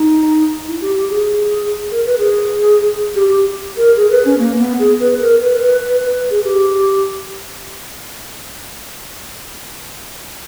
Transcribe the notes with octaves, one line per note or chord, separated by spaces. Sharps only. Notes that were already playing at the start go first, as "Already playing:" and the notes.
Already playing: D#4
E4
G4
G4
G#4
A#4
B4
G#4
G4
G4
A#4
G#4
B4
C#4
A#3
B3
G#4
B4
A#4
B4
B4
B4
B4
G#4
G4